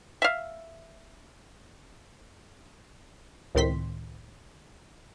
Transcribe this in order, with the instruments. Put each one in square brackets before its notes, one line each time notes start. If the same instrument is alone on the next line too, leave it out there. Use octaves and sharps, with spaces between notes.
[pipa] E5 F5
[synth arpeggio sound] C#2 A2 D#3 C4 C6 B6